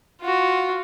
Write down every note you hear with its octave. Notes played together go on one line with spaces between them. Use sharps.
F4 F#4